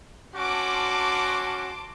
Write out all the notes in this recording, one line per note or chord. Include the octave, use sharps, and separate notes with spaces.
C#4 F#4 A5 C6 D6